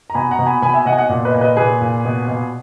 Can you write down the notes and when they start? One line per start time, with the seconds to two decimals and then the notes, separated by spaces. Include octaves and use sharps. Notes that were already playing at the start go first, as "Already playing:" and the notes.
0.10 A#5
0.15 B2 G#5 B5
0.31 F#5 A#5
0.39 B2
0.46 G#5 B5
0.62 B2 G#5 B5
0.74 E5 G#5
0.86 B2 D#5 F#5
0.92 G#5
0.97 D#5 F#5
1.09 A#2
1.25 B4 D#5
1.34 A#2
1.41 B4 D#5
1.57 A#2 G#4 B4
1.81 A#2
2.05 B2
2.28 B2